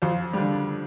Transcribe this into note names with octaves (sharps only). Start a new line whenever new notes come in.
F2 C5
D3 G3